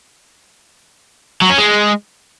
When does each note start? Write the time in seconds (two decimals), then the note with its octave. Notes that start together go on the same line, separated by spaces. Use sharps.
1.42 F#3
1.50 C#4
1.58 G#3